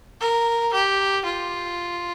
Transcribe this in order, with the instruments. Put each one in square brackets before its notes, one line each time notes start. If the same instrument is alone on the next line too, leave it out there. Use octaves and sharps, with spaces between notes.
[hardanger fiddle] A#4
G4
F4